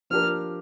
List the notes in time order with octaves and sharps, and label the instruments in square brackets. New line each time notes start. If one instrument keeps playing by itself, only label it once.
[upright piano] F3 D4 G4 A#4 [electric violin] F6